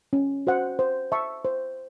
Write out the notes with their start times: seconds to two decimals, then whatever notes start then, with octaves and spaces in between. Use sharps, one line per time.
0.13 C#4
0.47 F#4 C5 F#5
0.79 C5
1.12 E5 A5 C#6
1.45 C5